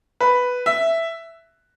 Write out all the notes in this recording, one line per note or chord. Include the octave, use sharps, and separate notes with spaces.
B4
E5